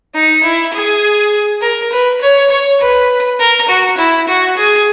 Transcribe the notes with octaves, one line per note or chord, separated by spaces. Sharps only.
D#4
E4
G#4
A#4
B4
C#5
C#5
B4
A#4
F#4
E4
F#4
G#4